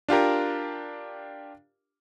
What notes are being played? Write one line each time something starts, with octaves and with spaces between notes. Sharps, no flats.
D4 F4 G4 A#4